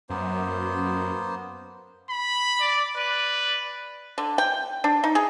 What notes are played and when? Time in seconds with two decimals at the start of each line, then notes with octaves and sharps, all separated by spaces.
0.10 F#2 A#3 B3 C5
2.09 B5
2.61 D5
2.96 B4 D5
4.18 D3
4.38 G5
4.84 D4
5.04 D#4
5.15 G#4